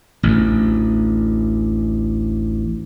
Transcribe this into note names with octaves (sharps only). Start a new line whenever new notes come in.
A1 D2